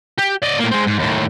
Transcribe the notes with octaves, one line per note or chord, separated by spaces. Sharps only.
G4
D5 D#5
A2 A#3
G#3 C4
G#2
D#2 A2